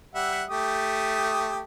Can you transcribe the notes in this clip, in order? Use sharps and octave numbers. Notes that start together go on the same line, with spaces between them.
G3 E5 F#5
A3 G4 D#6